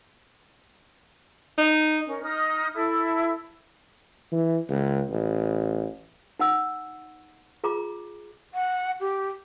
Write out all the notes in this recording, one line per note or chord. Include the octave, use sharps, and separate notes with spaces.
D#4
C#4 A#4
D#4 D#6 F6
E4 A4
E3
C#2
A1
D#4 F#5 E6
F4 G#4 A#5 D6
F#5
G4